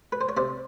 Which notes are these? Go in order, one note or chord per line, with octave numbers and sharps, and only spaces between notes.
B4
C5
C#5
C3 C5 D5